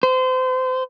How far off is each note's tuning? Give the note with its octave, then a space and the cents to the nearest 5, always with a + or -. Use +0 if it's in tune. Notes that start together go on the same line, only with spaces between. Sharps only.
C5 -30